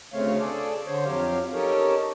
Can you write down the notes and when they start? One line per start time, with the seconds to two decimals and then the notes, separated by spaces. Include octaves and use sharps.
0.13 D2 C#3 A3 C4 C#5 F5
0.40 G#4 A4 D5
0.86 D3 C5 C#5
1.05 F2 F#3 G4 F5
1.54 C#4 D#4 G4 A4 A#4 C#5